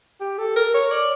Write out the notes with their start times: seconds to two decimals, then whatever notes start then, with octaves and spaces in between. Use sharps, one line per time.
0.21 G4
0.38 A4
0.56 A#4
0.74 C#5
0.92 D5